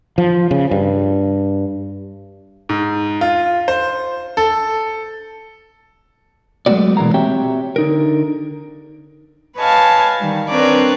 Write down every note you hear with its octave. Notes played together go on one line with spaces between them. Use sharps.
F3
C#3
G2
G#2
F4
C5
A4
F#3 G#3 A3 B3 F#4 D5
B2 E3 G#3 A#3 A#5
C4 F#4 G4 C#5 E5 G5
D3 D#4 A#4
B4 C#5 D#5 F5 G#5 A5
D#3 G3
C4 D4 A#4 B4 C#5 D5